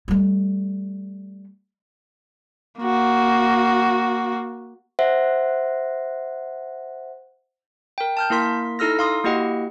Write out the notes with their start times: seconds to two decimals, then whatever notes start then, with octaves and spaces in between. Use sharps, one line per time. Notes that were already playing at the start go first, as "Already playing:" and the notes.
0.08 G3 A3
2.80 A#3 F#4
4.99 C5 E5 F#5
7.98 A#4 G5
8.17 A5 F6 G6
8.30 A#3 E4 A#4 C6 B6
8.79 D#4 E4 A4 E6 F6 A#6
8.99 F5 C6 D#6
9.24 A#3 E4 F#4 G4 D#5 F#5